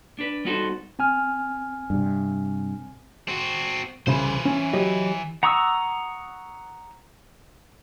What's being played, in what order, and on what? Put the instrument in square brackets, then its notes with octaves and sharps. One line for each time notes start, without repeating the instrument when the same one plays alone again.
[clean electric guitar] D4 B4
G3 B3 D#4 F#4 A4 C5
[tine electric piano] C4 G#5 F6
[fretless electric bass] G2 C3
[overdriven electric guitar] C4 F#4
[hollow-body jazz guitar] C2 C#3 B5 [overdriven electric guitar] E3 C5
[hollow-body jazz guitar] C#4
F#3 G4 D#5
[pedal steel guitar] F#5 A#5 C#6 D#6 E6